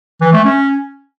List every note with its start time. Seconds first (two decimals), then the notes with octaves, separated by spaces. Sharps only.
0.21 E3
0.33 A3
0.45 C#4